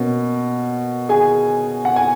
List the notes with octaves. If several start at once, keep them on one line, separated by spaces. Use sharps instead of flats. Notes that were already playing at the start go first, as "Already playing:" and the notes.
Already playing: B2 A#3 C#4
G#4 G#5
F#5
G#5